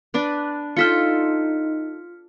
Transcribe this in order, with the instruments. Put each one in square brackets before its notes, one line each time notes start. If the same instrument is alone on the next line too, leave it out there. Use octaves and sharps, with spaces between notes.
[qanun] D4 B4 D5
[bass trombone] D#4 [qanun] F4 A4 G5 [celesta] F6 B6 C#7